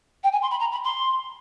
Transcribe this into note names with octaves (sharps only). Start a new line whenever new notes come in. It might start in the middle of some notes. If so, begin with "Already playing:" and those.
G5
G#5
C6
B5
A#5
B5
C6